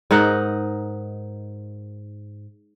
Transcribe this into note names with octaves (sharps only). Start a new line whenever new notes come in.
G#2 D#4 A#4 F#5